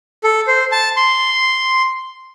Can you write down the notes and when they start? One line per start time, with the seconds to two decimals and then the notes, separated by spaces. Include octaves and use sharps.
0.24 A4
0.47 C5
0.72 A5
0.96 C6